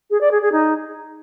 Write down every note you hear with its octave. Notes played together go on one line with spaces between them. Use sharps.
G#4
D5
G#4
G#4
D#4